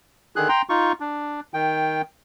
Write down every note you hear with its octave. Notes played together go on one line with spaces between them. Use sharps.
D3 D#3 G#4 F#6
G5 A#5 C6
D#4 F4 C#6
D4
D#3 G5